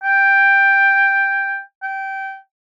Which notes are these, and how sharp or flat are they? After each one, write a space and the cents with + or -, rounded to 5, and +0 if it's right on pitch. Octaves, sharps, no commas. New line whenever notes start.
G5 +5
G5 -15